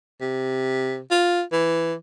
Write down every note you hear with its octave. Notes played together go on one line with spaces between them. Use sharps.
C3
F4
E3